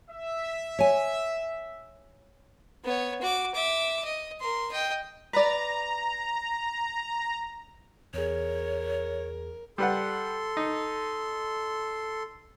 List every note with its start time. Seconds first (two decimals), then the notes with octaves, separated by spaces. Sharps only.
0.11 E5
0.79 C#5 G#5
2.84 B3 C#5
3.21 F#4 D6
3.54 E5 D6
4.04 D#5
4.40 A#4 C6
4.71 D#5 G5
5.33 B4 D5 A#5
8.14 E2 G#4 A#4 C#5
9.78 G3 A4 B4 F#5 C6
10.57 D#4